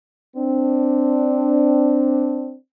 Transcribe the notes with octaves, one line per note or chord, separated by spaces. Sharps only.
C4 D4